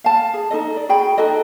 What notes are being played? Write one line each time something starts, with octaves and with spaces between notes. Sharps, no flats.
F5 A5
G#4
D#4 F4 A4 D#5
D5
F#4 G#4 G5 B5
D#4 F#4 A4 D#5